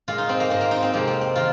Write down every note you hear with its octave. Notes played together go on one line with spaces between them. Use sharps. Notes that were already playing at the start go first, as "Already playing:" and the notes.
A#2 G#3 F4
D#4
C4
A#3
G#2 G#3 C4
A#3
D#4
C4
F2 C3 F3 G#3 A#3
C4
C4
D#3 F4